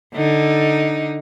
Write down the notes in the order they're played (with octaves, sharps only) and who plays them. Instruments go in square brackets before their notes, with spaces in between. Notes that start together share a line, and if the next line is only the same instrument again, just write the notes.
[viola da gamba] D3 D#4